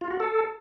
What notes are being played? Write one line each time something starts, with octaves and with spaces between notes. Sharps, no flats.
F4
F#4
A4